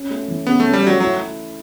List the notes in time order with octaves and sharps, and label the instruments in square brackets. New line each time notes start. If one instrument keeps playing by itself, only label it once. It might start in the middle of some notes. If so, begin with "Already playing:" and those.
Already playing: [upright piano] C#4
A3
E3
[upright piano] C#3 [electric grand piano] B3
[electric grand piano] A3 [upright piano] C#4
[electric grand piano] G3
[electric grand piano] F#3 [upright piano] A3
[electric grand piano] F#3 [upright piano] E4